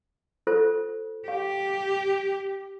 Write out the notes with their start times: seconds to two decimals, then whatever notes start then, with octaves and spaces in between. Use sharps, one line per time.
0.47 F4 A4 C5
1.28 G4 F5